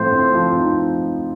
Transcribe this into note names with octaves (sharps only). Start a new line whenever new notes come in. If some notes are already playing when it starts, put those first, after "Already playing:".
Already playing: A2 F3 C4 C5
C4
F3
D#4